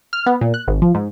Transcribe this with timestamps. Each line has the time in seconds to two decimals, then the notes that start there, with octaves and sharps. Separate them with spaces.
0.13 F6
0.26 B3
0.41 A#2
0.54 F#6
0.68 G#1
0.82 F3
0.95 G#2